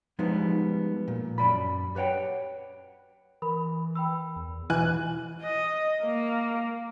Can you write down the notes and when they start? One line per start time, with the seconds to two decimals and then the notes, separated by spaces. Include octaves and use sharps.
0.19 F3 G3 G#3 B3 D#4
1.08 A#2
1.38 F#2 E3 D5 B5
1.95 G4 B4 C#5 F#5 G5
3.42 E3 A#4 B5
3.95 G5 B5 E6
4.36 E2
4.70 B2 E3 G#5 F#6
5.42 D#5
6.02 A#3